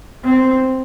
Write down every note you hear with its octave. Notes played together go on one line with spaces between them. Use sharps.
C4